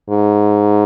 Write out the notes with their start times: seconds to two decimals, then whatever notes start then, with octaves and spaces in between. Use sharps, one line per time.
0.09 G#2